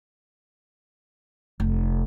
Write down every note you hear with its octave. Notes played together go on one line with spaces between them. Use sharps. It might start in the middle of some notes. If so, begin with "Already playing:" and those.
F1